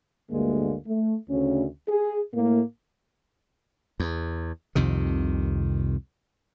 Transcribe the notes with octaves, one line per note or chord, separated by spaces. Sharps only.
D2 G2 D3 G#3 A#3
A3
D2 C#3 C#4
G#4
A2 A#3
E2
C2 F2 C3 D#3